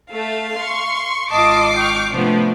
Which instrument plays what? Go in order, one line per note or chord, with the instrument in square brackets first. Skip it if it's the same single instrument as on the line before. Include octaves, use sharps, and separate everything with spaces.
[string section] A3 [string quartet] F5
[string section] C6 C#6
[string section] G#1 D6 C7 [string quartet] F4 D#5 A5
[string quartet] G5 C#6 F6
[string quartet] C3 F3 B3 [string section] A3 D4